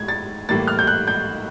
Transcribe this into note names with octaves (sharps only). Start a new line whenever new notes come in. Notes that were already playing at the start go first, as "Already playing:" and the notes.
Already playing: A2 G#3 G#6
A6
A2 E3 G3 A#3 A6
F6
G6
F#6
G6